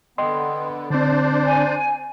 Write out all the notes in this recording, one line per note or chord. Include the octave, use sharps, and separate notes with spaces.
D3 B3 D#5 G5 C6
D3 C4 D4 C5 D5
G#5